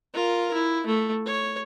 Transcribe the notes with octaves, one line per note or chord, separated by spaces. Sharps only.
F4 A#4
E4
A3
C#5